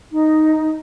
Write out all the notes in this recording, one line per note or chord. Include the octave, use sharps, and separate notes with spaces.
D#4